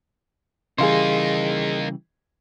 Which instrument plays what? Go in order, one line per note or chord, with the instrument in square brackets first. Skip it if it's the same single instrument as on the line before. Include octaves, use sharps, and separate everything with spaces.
[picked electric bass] C#3 E3 G3 [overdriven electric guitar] A#3 D#4 [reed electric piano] G#4 F5 C6